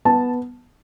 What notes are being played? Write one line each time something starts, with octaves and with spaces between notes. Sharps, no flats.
B3 A5